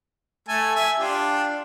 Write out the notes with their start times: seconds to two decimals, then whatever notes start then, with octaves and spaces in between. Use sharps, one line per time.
0.48 A3 A4 G#5
0.75 E5 G#5
0.99 D4 F4 G4